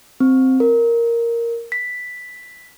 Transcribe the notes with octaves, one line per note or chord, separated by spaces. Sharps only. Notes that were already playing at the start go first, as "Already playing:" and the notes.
C4
A#4
B6